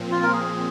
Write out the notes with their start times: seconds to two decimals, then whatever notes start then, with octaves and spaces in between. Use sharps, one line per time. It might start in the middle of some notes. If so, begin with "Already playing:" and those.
Already playing: A#2 F3 C4
0.11 F4
0.23 A#4
0.33 G#4